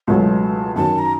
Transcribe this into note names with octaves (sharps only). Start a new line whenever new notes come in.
C#2 B2 F#3 A3 A5
F#2 D#3 F#3 A5
A#5